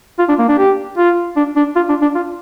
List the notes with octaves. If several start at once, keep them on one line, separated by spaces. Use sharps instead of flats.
F4
D4
A#3
D4
G4
F4
D4
D4
F4
D4
D4
F4